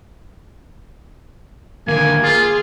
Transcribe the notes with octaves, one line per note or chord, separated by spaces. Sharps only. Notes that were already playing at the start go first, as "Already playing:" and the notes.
D#2 D3 A#3 G#5
F4 G#4 G#5